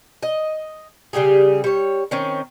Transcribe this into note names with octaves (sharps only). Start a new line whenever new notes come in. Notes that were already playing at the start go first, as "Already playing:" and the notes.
D#5
C#3 G3 G4 G#4
G3 C#5
D#3 C4 C#4